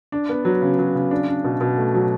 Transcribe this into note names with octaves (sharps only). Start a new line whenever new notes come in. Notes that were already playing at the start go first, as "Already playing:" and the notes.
D4
B3
F#3
C#3
F#3
C#3
D4
D4
B2
B2
A3
F#3